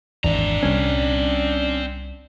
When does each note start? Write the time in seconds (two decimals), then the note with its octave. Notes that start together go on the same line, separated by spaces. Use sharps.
0.24 G#1 E2 C4 D4 A#5
0.63 C2 G3 C#4